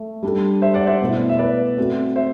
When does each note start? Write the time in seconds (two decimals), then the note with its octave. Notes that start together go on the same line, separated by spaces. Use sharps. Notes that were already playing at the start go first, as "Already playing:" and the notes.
Already playing: A3
0.23 G3 D4 A4
0.62 C5 E5
0.74 D5 F#5
0.87 C5 E5
1.01 B2 A3 E4
1.29 E5
1.38 B4 D5
1.77 A3 C4 F#4 A4
2.16 C5 E5